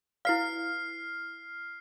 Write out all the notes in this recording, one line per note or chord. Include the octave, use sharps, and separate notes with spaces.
E4 B4 F5 F6 C7